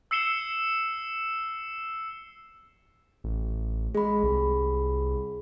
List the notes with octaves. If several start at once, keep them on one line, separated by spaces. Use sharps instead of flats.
E6 C7 C#7 E7 G7
A1
G#3 G#4 B5
C2